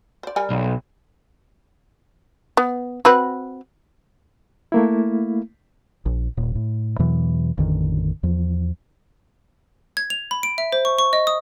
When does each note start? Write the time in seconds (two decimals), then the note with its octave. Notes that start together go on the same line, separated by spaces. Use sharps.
0.23 C5 D5
0.36 G3 A#4 G#5
0.50 B1
2.57 B3
3.05 C4 F#4 B4
4.72 A3 A#3 E4
6.06 A#1
6.37 D#1 A#2
6.55 A2
6.99 E2 B2 E3 F#3
7.58 A1 F2 D3 D#3
8.23 E2 F3
9.97 G#6
10.10 F7
10.31 B5
10.43 D7
10.58 E5
10.72 C5
10.85 C#6
10.99 C#6
11.13 D#5
11.27 D#6